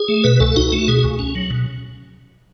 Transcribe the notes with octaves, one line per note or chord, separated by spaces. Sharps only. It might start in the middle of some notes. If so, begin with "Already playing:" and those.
Already playing: G#4
A3
B2 B4
C#2 A4
D#4 F#4
A3
B2 G#4
C#2
C#4
F#3
B2